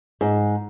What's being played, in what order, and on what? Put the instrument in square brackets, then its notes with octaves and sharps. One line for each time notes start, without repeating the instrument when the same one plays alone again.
[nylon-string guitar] G#2